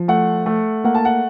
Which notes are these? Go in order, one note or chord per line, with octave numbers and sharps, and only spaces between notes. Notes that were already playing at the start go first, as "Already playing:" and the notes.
Already playing: F3
A3 F#5
A3
A#3 F#5
A5
F#5